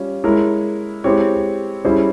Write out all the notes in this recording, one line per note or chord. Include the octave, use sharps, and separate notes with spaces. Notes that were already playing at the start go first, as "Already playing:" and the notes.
Already playing: G3 C#4 F4
G#3 E4 A#4 C#5
G#3 C4 E4 G4 C#5
G3 C#4 E4 G#4 C5